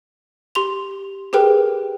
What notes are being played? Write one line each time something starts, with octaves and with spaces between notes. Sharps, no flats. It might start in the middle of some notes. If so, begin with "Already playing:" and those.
G4 C6 F7
G4 G#4 A#4 B4 G5